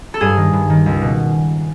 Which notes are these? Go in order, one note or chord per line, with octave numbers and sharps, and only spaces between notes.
A4
G2 G#4
D#3
G2
D#3
C#2
B2